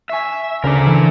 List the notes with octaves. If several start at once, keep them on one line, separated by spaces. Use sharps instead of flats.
E5 G#5 C#6 C7
D2 C#3 A#4 C5 D5
E3